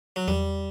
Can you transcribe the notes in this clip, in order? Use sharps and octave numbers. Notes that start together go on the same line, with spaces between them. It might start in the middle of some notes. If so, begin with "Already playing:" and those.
F#3
E2 G3